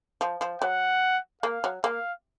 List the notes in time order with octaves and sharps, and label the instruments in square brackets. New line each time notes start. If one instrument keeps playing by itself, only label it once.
[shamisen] F3
F3
[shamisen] F#3 [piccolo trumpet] F#5
[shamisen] A#3 [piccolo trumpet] F5
[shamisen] F#3
[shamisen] A#3 [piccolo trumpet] F5